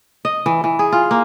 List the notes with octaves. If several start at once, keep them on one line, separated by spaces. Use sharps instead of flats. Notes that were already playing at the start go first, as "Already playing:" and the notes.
D#5
E3
E3
G#4
F4
A#3